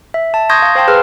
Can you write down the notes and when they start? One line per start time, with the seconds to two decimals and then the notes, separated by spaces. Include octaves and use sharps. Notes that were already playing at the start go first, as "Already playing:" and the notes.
0.14 E5
0.34 A5
0.50 C6 C#6 D#6 G6 G#6 A#6
0.62 F5
0.75 C5 F5 G5 A5 C6
0.88 G#4 B4 E6 F6